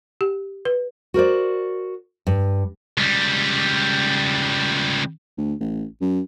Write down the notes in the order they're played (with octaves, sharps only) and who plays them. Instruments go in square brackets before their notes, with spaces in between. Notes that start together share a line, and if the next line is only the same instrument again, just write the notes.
[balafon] G4
B4
[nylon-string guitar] F#4 A#4 C5 D5
G2
[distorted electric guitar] C#2 G3
[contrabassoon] D2
A1
F#2